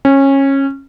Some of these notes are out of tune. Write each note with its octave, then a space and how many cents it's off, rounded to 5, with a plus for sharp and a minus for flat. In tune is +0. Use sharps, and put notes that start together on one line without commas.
C#4 -20